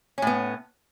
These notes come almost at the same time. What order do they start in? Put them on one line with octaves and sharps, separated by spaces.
C#4 A2 B3